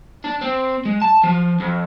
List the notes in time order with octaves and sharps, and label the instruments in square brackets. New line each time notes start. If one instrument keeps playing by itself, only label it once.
[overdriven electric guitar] D4
C4
G#3
A5
F3
F2